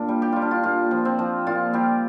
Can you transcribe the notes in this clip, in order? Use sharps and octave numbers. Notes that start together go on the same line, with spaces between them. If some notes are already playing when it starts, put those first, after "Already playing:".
Already playing: A#2 D4
G3
G4
G3 F4
D4
F4
A#2 F4
F3
C4
F3
A#2 F4
G3 G4